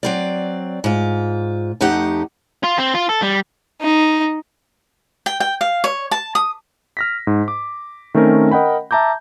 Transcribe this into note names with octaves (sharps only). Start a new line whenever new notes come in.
F#3 C4 D5
G#2 F4
F2 A3 D#4 G4 F#5
F4
C4
F4
A4
G3
D#4
G5
G5
F5
C#5
A5
D#6
F6 A#6 B6
G#2
D6
D#3 A3 C4 C#4 A#4
A#4 D#5 F#5 G5 B5
E5 A5 A#5 D6 G6